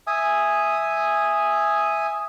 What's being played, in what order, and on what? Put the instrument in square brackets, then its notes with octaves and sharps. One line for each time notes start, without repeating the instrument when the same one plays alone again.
[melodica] E5 G#5 D#6